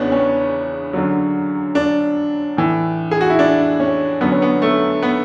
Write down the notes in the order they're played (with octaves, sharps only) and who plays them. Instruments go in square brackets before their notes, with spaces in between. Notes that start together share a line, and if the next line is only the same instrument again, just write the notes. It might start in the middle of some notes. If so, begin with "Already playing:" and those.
Already playing: [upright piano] E2 C#3 E3 B3 C#4 D4
C#4
F#2 D3 F#3
D4
A2 E3
G#4
F#4
E4
D4
C#4
F#2 D3 F#3 B3
C#4
B3
A3
B3